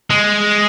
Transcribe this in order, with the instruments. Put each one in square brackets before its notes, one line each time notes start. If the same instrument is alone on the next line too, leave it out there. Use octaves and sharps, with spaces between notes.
[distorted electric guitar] G#3